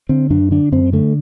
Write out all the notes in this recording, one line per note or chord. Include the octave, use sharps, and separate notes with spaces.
D3 C4
F#2 D4
D3 D4
F#2 C4
D3 A3